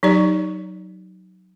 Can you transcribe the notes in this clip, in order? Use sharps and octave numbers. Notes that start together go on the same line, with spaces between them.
F#3 D#4 G4 D5